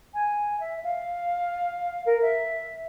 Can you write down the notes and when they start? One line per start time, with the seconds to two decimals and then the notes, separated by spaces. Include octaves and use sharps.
0.14 G#5
0.60 E5
0.84 F5
2.06 A#4
2.21 E5